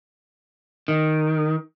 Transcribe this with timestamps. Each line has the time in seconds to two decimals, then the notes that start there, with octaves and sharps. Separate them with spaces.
0.88 D#3